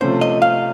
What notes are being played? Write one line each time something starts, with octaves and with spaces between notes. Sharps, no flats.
C3 F3 A3 C#4 C5
D#5
F5